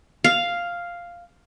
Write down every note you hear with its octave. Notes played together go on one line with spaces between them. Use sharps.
F5